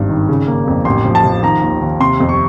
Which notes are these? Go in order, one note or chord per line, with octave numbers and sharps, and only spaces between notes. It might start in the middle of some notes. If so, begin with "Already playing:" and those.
Already playing: G#1 G2
D#3
C#3
A#3
F2
A1 C6
F3
A5
F3
D#3 A#5
D#2
D#2
C3 C6
F2
C#6